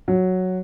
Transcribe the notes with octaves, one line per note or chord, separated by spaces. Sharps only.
F#3